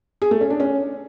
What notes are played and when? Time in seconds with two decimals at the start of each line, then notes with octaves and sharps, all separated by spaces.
0.22 G#4
0.31 A3
0.41 C#4
0.50 D4
0.60 C#4